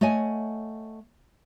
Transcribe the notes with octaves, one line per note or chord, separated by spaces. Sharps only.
A3 C#5 D#5 F#5 G#5